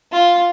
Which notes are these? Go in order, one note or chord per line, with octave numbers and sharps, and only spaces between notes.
F4